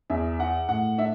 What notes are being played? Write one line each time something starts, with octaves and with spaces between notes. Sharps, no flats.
E2 E5
E4 F#5
A2 F#5
D4 E5